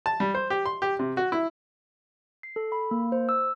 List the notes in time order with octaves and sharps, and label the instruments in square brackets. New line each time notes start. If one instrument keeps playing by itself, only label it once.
[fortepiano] A5
G3
C5
G4
C6
G4
C3
F#4
E4
[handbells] C7
A4
B5
A#3
C5
E6